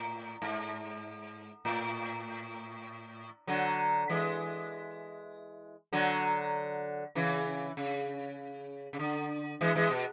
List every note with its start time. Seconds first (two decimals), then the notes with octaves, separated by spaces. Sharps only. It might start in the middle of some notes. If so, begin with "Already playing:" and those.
Already playing: A2
0.42 G#2
1.65 A2
3.47 D3 F#3
4.10 E3 G#3
5.93 D3 F#3
7.15 C#3 E3
7.77 C#3
8.93 C#3
8.99 D3
9.61 E3 G#3
9.75 E3 G#3
9.90 B2